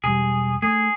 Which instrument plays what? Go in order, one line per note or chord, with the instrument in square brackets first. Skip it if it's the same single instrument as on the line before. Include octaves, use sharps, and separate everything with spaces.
[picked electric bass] E1 G3 [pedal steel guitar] G#4
[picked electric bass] A3 [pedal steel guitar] G#4